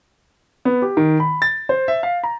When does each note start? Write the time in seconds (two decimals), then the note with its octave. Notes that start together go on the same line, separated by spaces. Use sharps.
0.65 B3
0.82 G4
0.97 D#3
1.20 B5
1.42 A6
1.69 C5
1.88 E5
2.03 F5
2.23 A#5